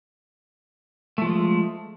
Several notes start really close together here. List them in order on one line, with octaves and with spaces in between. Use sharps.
A3 F3 G#3